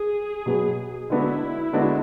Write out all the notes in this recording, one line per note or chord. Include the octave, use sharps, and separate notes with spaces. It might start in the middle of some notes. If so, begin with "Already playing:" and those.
Already playing: G#4
B2 F#3 B3
D3 G#3 B3 D4 E4 F#4
D3 G#3 B3 D4 F#4